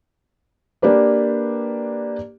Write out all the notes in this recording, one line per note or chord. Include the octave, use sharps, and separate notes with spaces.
A#3 D4 G4 B4 D5